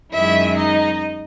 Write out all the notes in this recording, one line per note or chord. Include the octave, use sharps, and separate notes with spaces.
F#2 D#3 G#3 E4 E5
D#4 D#5